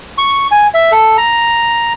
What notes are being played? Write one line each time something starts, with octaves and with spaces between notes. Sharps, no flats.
C#6
G#5
E5
A4
A#5